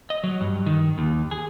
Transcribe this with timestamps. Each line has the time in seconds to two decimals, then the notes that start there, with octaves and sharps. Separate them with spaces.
0.10 D#5
0.24 F#3
0.41 G2
0.66 D#3
0.98 D#2
1.31 G#4